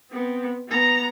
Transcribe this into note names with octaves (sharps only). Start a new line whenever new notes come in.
B3 C4
B3 A#5